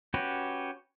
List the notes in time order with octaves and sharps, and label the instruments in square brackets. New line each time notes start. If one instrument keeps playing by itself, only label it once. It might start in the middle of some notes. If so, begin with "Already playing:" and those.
[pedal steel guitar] C#4 F#4 G4 B4